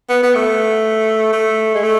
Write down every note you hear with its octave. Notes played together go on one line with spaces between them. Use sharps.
B3
B3
A3
A3
G#3
A3